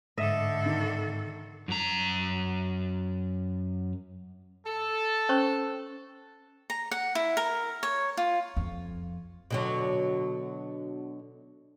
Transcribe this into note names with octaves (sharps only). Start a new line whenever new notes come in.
G#2 D3 A4 D#5 E5
D#3
F#2 A#5
A4
C#4 C5 C#6
A#5
F#5
E4
A#4
C#5
F4
F2
B2 D3 F#3